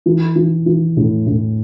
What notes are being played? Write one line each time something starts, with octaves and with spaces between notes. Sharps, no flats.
E3
E3
E3
A2
A2